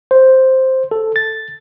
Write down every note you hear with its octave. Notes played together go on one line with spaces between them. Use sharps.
C5
A4
A6